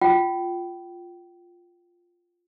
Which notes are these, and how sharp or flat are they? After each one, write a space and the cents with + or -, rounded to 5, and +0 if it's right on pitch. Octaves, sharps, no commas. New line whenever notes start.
F4 +0 G5 -20